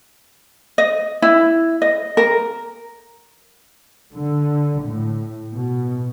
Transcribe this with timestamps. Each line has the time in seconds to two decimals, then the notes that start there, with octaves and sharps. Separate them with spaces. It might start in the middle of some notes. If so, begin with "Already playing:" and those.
0.78 D#5
1.22 E4
1.82 D#5
2.17 A#4
4.14 D3
4.82 A2
5.54 B2